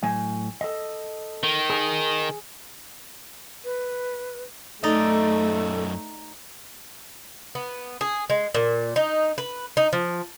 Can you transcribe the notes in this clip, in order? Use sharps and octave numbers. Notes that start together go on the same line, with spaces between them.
A2 F#3 G#5
A4 D#5
D#3
G#4
B4
F#2 A3 D#4 A4 D5 D#5
B3
G#4
G#3
A#2
D#4
B4
D#4
F3